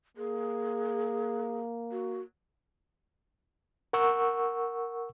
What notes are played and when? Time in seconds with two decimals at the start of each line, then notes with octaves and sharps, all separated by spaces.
0.17 A#3 G#4
1.92 F#4
3.93 A#4 F#5 C#6 E6